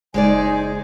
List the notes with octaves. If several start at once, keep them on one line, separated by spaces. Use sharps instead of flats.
F#1 G#3 D#4 G#4 C5 D5 G#5